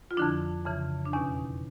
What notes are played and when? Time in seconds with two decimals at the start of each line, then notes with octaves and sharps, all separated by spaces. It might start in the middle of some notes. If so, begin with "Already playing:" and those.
0.11 F4
0.17 F2 D3 F3 D4 E4
0.65 F2 C#3 E3
1.06 D4
1.13 E2 B2 C#4 D#4